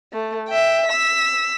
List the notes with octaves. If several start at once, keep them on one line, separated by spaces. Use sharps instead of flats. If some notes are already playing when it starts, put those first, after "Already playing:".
A3
E5 G5
E6 B6